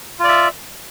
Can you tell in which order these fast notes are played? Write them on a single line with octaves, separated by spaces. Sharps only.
F4 D5 E5